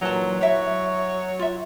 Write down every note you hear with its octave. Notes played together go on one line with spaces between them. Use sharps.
A#2 E3 F#3 D#4 A5
F#3 E4 C#5 E5
F4 E5